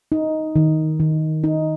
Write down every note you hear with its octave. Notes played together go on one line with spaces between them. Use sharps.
D#4
D#3
D#3
D#4